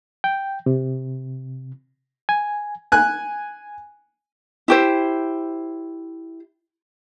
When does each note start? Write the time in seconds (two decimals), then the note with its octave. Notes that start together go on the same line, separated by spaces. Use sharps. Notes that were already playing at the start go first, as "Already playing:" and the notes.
0.24 G5
0.66 C3
2.29 G#5
2.92 G#5 F#6
4.68 E4 G4 C5